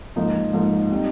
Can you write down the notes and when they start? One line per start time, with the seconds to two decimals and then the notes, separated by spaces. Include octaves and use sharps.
0.16 G#2 F3 A#3 D#4
0.53 G#2 F3 A#3 D#4
0.92 G3 C4 D#4